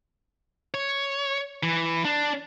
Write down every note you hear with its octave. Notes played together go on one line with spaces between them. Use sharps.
C#5
E3
D4